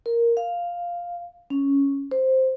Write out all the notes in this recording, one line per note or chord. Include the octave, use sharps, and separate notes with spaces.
A#4
F5
C#4
C5